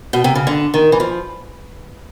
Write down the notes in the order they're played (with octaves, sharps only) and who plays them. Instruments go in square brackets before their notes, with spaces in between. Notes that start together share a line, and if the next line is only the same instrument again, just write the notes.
[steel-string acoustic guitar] B2
C3
C#3
D3
D#3
E3
F3